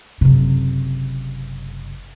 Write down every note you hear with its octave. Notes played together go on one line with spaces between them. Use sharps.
F#1 C3